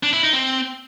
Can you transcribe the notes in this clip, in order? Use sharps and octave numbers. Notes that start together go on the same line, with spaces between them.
D4
E4
D#4
C4